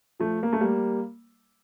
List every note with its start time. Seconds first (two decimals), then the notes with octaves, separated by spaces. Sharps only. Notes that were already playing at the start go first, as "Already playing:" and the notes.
0.20 F3 A3
0.43 A#3
0.53 A3
0.61 G3 A#3